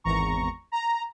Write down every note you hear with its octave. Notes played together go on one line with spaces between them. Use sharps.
G#1 E2 A#5 C#6
A#5